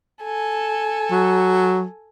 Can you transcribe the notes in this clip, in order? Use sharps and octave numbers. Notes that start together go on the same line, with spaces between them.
A4 G#5
F#3